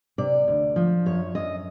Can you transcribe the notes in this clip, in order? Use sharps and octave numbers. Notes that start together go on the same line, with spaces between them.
C3 D5
D2
F3
F#2 C#5
F#2 D#5